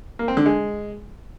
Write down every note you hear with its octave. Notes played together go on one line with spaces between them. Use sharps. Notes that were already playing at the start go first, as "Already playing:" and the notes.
A#3
C4
D3
G#3